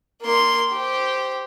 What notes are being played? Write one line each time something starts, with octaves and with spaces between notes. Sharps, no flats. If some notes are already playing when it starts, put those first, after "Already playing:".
A#3 C6
G4 C5